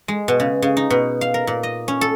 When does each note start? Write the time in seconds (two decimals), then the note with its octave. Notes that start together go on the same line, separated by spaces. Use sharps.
0.08 G#3
0.28 B2
0.40 C#3
0.62 C#3
0.77 D#4
0.90 B2
1.21 F5
1.34 A#4
1.47 A#2
1.63 D#5
1.88 C#4
2.01 A4